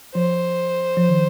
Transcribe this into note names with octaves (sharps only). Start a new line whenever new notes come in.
F3 C5
F3
D#3